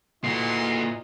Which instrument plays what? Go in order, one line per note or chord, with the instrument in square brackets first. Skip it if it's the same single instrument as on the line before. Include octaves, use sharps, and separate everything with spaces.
[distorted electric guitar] A#2 [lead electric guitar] A3 F#4 [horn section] E4 B4 D#5 [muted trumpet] C6